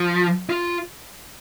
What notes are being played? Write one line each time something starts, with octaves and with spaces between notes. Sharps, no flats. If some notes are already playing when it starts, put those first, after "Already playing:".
Already playing: F3
F4